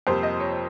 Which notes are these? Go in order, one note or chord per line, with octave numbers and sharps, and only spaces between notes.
F2 C3 G3 A#3 C5
D#5
C#5